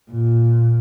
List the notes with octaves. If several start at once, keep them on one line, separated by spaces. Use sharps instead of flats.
A#2